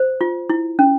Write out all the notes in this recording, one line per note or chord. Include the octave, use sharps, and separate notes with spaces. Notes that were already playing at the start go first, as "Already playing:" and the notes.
Already playing: C5
F4
E4
C#4